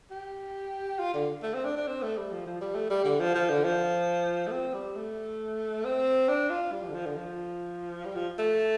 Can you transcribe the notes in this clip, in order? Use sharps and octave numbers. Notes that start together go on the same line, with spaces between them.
G4
F4
D3
A3
C4
D4
D4
C4
A3
G3
F3
F3
G3
A3
G3
D3
F3
F3
D3
F3
A3
C4
G3
A3
C4
D4
F4
G3
F3
D3
F3
D3
F3
G3
F3
A3